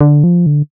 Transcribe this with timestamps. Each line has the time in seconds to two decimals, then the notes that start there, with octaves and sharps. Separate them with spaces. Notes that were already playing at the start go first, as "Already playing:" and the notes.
0.01 D3
0.24 F3
0.46 D3